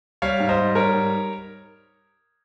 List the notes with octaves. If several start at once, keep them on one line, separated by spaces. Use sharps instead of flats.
G3 C#5 F5
G#2
C5 D#5
G3
G3 A#4 C#5
G#2